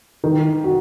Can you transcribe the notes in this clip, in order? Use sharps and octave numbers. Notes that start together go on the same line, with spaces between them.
D#3
F#4